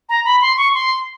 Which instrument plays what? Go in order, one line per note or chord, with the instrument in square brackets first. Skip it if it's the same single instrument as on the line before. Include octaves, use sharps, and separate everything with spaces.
[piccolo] A#5
B5
C6
C#6
C6